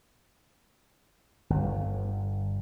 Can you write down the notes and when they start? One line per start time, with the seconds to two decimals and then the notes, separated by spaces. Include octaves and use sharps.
1.50 G1